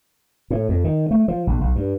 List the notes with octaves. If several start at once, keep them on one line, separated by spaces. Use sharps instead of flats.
A2
F2
D#3
A3
F3
A#1
B1
G2